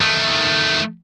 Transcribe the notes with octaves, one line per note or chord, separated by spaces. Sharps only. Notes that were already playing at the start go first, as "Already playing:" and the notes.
D#3 A3